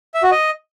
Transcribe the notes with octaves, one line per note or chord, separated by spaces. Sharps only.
E5
F#4
D#5